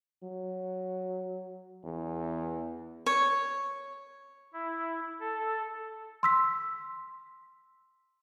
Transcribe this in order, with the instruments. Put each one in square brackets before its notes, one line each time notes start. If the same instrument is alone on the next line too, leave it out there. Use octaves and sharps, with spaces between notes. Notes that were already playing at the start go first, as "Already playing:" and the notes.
[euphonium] F#3
E2
[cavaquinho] C#5
[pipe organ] E4
A4
[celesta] C6 E6 B6